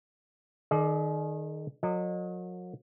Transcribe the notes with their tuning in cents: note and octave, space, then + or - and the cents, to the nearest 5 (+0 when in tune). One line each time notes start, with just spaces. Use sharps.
D#3 -10 G#4 +40 D5 +15
F#3 -40 A#4 -35 D#5 -35